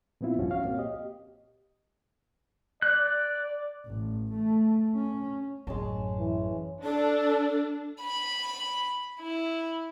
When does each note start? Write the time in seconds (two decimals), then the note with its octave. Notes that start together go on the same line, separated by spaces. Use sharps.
0.21 A#2 F3 B3 C4 E4 F4
0.39 C2 G2 F3 C#4 F4 F#4
0.51 F#4 C#5 F5
0.65 A#2 A#3 C4
0.78 G4 D#5
2.82 D5 F#6
3.86 A1
4.33 A3
4.95 C#4
5.67 A1 F#2 G#3 C#4 A5
6.19 E3
6.84 D4 A4
8.01 B5
9.21 E4